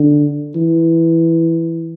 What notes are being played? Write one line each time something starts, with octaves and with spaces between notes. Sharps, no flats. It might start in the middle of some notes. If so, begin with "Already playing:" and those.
Already playing: D3
E3